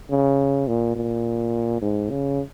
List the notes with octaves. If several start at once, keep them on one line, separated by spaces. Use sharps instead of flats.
C#3
A#2
A#2
G#2
C#3